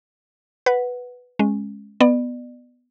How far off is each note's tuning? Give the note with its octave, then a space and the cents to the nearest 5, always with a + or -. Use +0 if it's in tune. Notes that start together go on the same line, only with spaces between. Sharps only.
B4 +0 F#5 +0
G#3 +0 C#4 -15
B3 +0 D5 +35